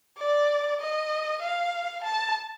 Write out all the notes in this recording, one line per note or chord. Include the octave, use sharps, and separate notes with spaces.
D5
D#5
F5
A5